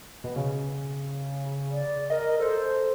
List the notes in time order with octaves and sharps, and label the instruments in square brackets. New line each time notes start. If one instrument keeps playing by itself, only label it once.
[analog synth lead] B2
C#3
[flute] D5
[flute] A#4 [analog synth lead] D#5
[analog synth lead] A4 [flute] C5